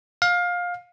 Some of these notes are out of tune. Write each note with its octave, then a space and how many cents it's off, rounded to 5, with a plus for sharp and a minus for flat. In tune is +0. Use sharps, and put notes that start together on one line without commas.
F5 +20